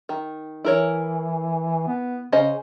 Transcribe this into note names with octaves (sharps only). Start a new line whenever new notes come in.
D#3
E3 E4 A#4 C#5
B3
C#3 C#4 C5 D#5